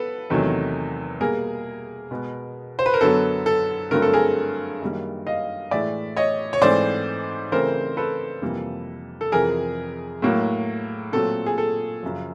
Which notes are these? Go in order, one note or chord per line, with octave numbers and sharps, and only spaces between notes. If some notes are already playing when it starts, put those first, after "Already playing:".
Already playing: B3 A4 B4
E2 C3 D#3 F#3 A3
B2 G3 A#3 G#4 A#4
B2 G#3 B3
C5
B4
A#4
F#2 D3 F#3 B3 A4
A4
G2 D3 F#3 A3 C4 A#4
A4
G#4 A#4
F#2 D#3 G3 A#3
D#5 F5
A2 E3 G#3 D5 E5
C#5 D#5
C#5
G#2 E3 A3 C4 C5 D5
C#3 E3 A3 C4 A#4 C5
A4 B4
F2 C3 E3 G3 A#3
A4
F2 C3 E3 G#4 A#4
A2 F#3 A#3
A#2 F#3 A3 C4 A4
G#4
A4
F#2 C#3 F3